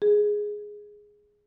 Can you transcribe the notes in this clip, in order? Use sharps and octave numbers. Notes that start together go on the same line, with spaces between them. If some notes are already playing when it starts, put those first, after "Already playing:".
G#4